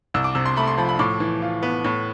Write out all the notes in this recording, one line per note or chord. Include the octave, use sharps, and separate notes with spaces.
C2 E6
D6
C3 E6
C6
A3 B5
C6
F3 B5
B5
A2 D6
E3
F4
B3
A2